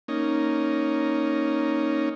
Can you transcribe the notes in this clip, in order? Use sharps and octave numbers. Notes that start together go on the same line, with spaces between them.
A#3 C#4 D#4